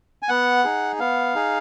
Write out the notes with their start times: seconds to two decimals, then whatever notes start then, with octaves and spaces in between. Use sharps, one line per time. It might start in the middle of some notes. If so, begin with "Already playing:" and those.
0.22 G#5
0.29 B3 F#5
0.64 D#4 G#4
0.99 B3 F5
1.35 D#4 G#4